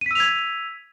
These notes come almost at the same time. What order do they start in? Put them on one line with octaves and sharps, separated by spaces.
D#7 B6 E6 F7 G#6